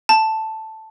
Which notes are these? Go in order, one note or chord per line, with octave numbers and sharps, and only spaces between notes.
A5